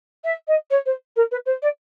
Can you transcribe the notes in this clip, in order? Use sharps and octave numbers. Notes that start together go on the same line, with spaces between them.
E5
D#5
C#5
C5
A#4
B4
C5
D5